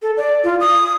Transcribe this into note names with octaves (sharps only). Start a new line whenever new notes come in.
A4
D5
F4
D#6